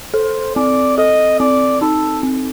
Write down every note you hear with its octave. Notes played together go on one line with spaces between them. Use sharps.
A4 C5
C4 D5
A4 D#5
C4 D5
D#4 A4
C4